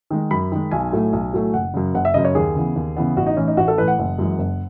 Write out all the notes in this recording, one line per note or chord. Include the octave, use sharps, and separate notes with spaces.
D#3 G#3
F#2 B5
D#3 G#3
B1 G#5
A2 F#3 A3
B1
A2 F#3 A3
F#1 F#5
F#2 C#3
F#1 F#5
E5
F#2 C#3 D#5
C#5
D#2 G#4
C#3 E3 B3
D#2
C#3 E3 B3
A1 F#4
D#4
A2 E3 C#4
D#4
A1 F#4
A4
A2 E3 B4
F#5
F#1
F#2 E3 G#3
F#1